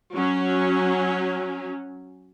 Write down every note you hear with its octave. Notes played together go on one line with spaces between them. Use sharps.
F#3 C#4